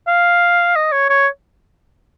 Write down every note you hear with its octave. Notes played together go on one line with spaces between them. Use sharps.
F5
D#5
C#5
C#5